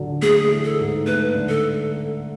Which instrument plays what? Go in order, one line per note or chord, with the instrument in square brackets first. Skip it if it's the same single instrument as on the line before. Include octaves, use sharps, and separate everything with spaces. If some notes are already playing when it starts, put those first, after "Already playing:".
Already playing: [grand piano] D3 F#3
[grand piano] A3 [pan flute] G#4
[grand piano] E3
[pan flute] A4
[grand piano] G#2
[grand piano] A3 [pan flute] B4
[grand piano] D3
[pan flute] A4